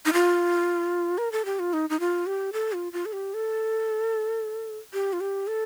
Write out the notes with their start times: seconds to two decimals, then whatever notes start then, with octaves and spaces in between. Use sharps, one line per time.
0.06 D#4
0.13 F4
1.18 A#4
1.32 A4
1.45 G4
1.59 F4
1.73 D#4
1.90 D#4
2.00 F4
2.26 G4
2.53 A4
2.73 F4
2.93 F4
3.06 A4
3.13 G4
3.34 A4
4.94 G4
5.13 F4
5.21 G4
5.47 A4